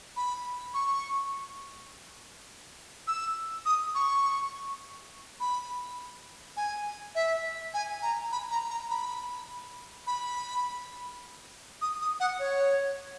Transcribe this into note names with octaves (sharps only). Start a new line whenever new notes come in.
B5
C#6
E6
D#6
C#6
B5
G#5
E5
G#5
A#5
B5
A#5
A#5
B5
B5
D#6
D#6
F#5
C#5